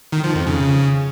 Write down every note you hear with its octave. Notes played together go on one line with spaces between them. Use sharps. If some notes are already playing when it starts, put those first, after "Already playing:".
D#3
F3
F2
C#3